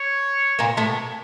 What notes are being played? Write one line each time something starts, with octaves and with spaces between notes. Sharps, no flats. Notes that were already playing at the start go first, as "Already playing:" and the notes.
Already playing: C#5
A#2 A#3
A2 A3